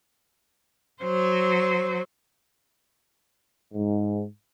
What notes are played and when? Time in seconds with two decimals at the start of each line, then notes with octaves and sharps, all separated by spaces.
1.02 F#3 C5
3.74 G#2